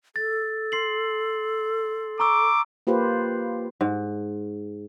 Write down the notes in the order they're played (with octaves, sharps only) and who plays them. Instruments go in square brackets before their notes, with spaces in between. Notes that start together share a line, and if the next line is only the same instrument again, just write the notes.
[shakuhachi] A4 [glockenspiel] A6
[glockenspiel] C6 C7 F#7
[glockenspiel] A#5 C#6 E6 [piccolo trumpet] D6
[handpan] A#3 F4 G4 B4 C5
[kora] G#2